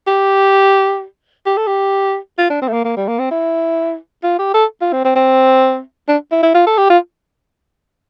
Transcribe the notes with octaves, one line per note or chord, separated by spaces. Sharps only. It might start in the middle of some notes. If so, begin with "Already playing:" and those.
G4
G4
A4
G4
F4
D4
C4
A3
A#3
A#3
G3
A#3
C4
E4
F4
G4
A4
F4
C4
C4
C4
D4
E4
E4
F4
A4
G4
F4